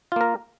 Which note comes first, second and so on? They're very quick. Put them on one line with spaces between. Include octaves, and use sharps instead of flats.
F4 A#3 A#4